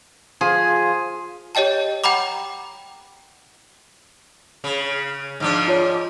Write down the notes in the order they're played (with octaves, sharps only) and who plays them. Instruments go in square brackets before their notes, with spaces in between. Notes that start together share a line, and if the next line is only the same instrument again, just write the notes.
[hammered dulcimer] F3 [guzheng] G#4
[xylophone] G4 C#5 D#5 G5 A5
F#5 G5 A#5 B5 D6
[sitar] C#3
G#2 F3 D4
[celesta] F4 C#5